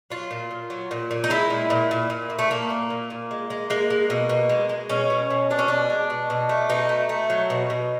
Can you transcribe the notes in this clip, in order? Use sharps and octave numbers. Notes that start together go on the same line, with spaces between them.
F#3 F4
A#2
A#2
F#3
A#2
A#2
D#4
G#3 E4
A#2
A#2
A#2
A#2
A#2
A3
A#2 A#3
A#2
A#2
A#2
G#3
G#3
G#3 A#3
G#3
B2
B2
G#3
G#3
B2 C#4
B2
B2
B2 D4
C#4
B2 D4
G#3
B2
B2
A3
B2 D#4
A3
A3
F#3
B2
B2